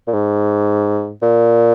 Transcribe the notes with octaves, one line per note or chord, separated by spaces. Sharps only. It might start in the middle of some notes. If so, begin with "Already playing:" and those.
A#2
G#2
A#2